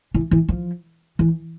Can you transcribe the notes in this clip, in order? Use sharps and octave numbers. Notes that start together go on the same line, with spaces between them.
E3
E3
F3
E3